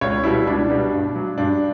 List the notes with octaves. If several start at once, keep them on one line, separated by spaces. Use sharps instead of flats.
C#2 C#5
B2 G3 E4
C#2 D4
B2 G3
G2
F#3
G2 D4